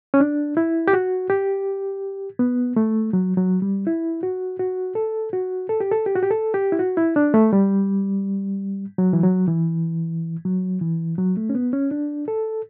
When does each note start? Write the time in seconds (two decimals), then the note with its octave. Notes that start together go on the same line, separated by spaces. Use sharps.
0.14 C#4
0.20 D4
0.57 E4
0.88 G4
0.93 F#4
1.30 G4
2.39 B3
2.76 A3
3.13 F#3
3.37 F#3
3.62 G3
3.87 E4
4.23 F#4
4.59 F#4
4.95 A4
5.33 F#4
5.69 A4
5.80 G4
5.92 A4
6.06 G4
6.16 F#4
6.23 G4
6.31 A4
6.54 G4
6.72 E4
6.79 F#4
6.97 E4
7.16 D4
7.34 A3
7.53 G3
8.98 F#3
9.13 E3
9.23 F#3
9.48 E3
10.45 F#3
10.81 E3
11.18 F#3
11.37 A3
11.50 C#4
11.55 B3
11.73 C#4
11.91 D4
12.28 A4